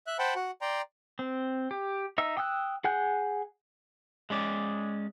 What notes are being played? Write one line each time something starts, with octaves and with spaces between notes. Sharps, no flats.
E5 F#6
C5 F#5 G5 A5 B5
F#4 F#5
D5 G5 A#5 C6
C4
G4
D#4 E5 E6
G5 D#6 E6 F#6
G#4 F#5 G#5 F#6 G6
G#3 C#4 D5